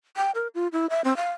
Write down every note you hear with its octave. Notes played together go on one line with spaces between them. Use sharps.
G5
A#4
F4
E4
E5
C4
F5